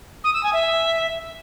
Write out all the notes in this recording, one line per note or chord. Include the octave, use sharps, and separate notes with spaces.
D#6
E6
G#5
E5